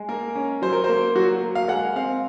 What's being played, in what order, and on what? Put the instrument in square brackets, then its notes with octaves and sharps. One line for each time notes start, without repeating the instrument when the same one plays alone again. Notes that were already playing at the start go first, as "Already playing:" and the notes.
Already playing: [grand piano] G#3
A#3 A#4
C#4
F#3 C5
A#4
A#3 C5
F#3 F#4
A#3
F5
G#3 F#5
C4 F5